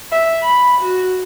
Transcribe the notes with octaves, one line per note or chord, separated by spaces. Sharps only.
E5
B5
F#4